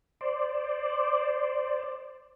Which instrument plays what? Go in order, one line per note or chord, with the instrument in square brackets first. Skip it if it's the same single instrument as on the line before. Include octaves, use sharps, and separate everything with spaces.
[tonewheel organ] C5 D5